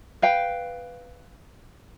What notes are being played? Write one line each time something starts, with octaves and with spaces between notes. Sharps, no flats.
B4 F5 G5